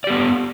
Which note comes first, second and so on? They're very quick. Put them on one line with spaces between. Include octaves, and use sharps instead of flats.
D5 G4 B3